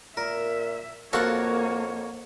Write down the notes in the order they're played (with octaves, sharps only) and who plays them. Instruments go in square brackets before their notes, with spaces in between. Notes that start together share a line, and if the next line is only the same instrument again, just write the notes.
[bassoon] A#2 [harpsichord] A#4 [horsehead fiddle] E5
[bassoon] F2 [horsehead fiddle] A#3 C#5 [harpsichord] F4 F#4 A4 [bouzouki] A#4 F#5